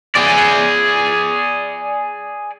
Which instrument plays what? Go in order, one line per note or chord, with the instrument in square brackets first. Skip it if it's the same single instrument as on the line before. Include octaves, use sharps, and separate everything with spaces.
[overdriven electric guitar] G#4 D5